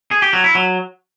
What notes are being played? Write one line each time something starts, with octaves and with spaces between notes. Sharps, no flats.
G#4
G4
F#3
E4
F#3